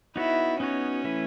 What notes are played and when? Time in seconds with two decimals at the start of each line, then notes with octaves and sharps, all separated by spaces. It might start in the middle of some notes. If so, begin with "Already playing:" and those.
0.16 B3 D#4 E4 F#4 C#5
0.60 B3 C#4 D#4 F#4 C#5
1.04 E3 A3 E4 B4